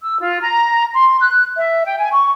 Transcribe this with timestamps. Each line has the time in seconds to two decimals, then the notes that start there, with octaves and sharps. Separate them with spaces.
0.03 E6
0.20 F4
0.42 A#5
0.95 C6
1.20 F#6
1.58 E5
1.86 G5
1.99 G#5
2.12 C#6